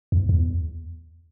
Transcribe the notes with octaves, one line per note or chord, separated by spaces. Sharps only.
E2
E2